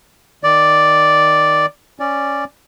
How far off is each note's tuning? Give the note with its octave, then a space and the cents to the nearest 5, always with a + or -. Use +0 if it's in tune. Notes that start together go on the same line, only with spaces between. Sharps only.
D#3 +0 D5 +0
C#4 -5 D5 +0